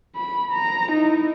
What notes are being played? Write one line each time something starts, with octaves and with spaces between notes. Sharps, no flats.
B5
A#5
D#4 E4